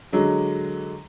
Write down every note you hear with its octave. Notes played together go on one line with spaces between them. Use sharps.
D3 F#3 G#3